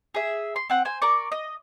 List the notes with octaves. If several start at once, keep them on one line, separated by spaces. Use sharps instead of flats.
G#4 E5
C6
C4 F#5
C5 G#5
A#4 D5 C#6
D#5